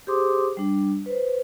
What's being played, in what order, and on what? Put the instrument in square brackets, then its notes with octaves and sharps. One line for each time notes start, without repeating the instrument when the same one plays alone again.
[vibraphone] G4 G#4 C5 C6 D6 D#6
G3 D4
B4 C5